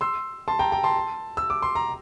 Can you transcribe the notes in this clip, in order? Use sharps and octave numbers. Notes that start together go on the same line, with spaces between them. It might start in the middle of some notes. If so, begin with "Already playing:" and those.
C6 E6
A5 C6
G5 A#5
G5 A#5
A5 C6
E6
D6
C6
A#5